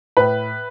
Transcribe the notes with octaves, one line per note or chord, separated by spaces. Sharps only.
A2 B4